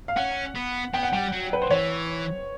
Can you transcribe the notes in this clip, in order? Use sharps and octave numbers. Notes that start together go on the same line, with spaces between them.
F5
C#4 F#5
B3
B3 G5
F#5
G3 G5
F#3
B4
C5
E3 C#5